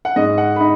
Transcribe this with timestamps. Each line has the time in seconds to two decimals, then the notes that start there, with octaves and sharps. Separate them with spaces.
0.05 F#5
0.16 G#2 D#5
0.38 F#5
0.56 B5
0.60 D#4